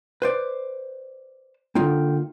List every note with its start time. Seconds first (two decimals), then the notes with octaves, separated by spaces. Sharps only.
0.22 B4 C5 D5
1.75 D3 A#3 D#4 F4 G5